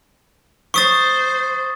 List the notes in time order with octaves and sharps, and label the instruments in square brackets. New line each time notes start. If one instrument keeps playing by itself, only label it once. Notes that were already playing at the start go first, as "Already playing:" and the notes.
[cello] C5 [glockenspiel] C#6 D#6 A6